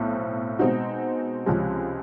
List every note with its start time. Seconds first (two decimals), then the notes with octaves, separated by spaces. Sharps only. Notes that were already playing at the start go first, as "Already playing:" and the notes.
Already playing: B1 A2 A3 C4
0.59 B2 G#3 C4 D#4 F#4
1.46 C#2 C3 F3 G#3 C#4